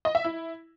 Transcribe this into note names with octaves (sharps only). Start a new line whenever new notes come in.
D#5
E5
E4